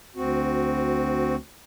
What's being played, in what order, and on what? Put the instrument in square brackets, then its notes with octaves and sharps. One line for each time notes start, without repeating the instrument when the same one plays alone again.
[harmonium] D2 C4 F#4